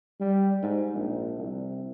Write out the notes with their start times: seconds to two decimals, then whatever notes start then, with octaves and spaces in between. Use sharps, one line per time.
0.20 G3
0.63 G#2
0.94 A#1
1.38 C2